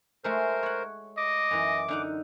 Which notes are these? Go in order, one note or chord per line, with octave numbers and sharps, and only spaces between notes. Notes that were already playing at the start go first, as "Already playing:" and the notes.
G#3 A3 F#4 A#4 C5
C#5 F#5
D#5 D6
F#2 E3
D3 D#4 F#5